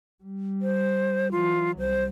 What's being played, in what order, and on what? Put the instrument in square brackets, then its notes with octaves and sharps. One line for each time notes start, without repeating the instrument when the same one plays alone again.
[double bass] G3
[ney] C5
[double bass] E3 F#3 [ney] F4
[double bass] C2 [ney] C5